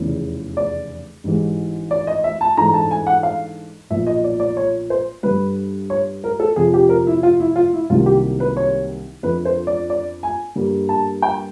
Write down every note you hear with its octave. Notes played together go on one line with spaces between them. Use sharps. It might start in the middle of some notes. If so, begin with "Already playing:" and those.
Already playing: F1 E2 C#3
D5
A1 G#2 E3 G#3
D5
D#5
E5
A5
G#2 E3 A3 D4 A#5
A5
G#5
F#5
F5
B1 A#2 F3 E5
D#5
D5
D5
C#5
C5
G2 D3 G3 B4
C#5
A#4
A4
F2 C3 F3 G#4
G4
A#4
E4
F4
E4
F4
E4
C2 C3 D#3 F#3 A#3 F4
G4
B4
C#5
F2 D3 F3 B4
C5
D5
D5
G#5
G2 D3 G3 A#3
A5
G5